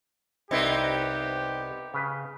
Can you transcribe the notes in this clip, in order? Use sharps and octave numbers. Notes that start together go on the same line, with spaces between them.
C2 B3 C4 D#4 E4 G4
C#3 B4